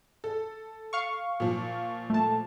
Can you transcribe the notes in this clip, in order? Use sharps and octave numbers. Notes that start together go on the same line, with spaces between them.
A4
F5 C#6
A#2 F3
A3 A5